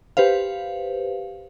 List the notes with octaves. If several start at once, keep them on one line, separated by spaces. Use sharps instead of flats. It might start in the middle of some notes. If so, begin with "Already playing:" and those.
G4 B4 C5 F5